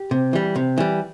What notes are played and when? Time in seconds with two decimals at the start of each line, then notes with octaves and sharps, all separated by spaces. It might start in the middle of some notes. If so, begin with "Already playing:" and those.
Already playing: G4
0.11 C3
0.33 E3 G3
0.56 C3
0.78 E3 G3